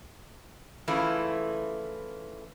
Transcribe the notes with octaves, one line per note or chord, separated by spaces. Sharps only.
C#3 E3 A3 E4 F4